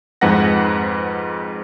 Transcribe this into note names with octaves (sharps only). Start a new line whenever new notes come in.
F2 G#2 B4 F#5 A#6